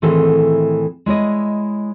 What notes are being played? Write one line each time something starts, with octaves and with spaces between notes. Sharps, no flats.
A2 D#3 E3 C4 G#4 A4
G#3 E4 C#5 D#5